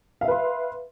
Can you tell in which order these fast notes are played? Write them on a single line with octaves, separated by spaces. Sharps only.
F5 E5 B4 C6